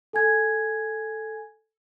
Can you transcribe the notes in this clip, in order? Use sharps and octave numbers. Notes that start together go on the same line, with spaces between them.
A4 G#5 G#6